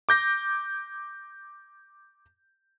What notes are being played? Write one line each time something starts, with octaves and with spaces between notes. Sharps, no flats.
D6 G6 A#6